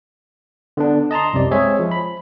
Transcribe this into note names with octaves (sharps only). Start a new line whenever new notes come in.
D3 B3 D4
D#5 A5 A#5 C6
C2 F#2 C3 D5
G#3 C4 G#4 C#5 E5
F3
B5